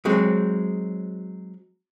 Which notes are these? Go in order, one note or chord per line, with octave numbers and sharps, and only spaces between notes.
F#3 G#3 C4